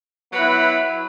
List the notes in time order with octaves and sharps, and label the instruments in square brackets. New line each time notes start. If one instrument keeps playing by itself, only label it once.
[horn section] F#3 B3 E4 B4